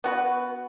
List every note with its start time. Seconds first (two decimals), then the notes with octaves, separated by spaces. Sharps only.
0.04 B3 F#4 B4